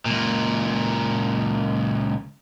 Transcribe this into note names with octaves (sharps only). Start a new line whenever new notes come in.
C#2 A#2